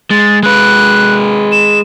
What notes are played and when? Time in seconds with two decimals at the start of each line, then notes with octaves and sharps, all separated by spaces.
0.11 G#3 A6
0.43 G#3 B4 F#6
1.52 E7